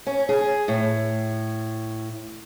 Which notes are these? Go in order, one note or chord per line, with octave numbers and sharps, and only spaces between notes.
C#4
G#4
A2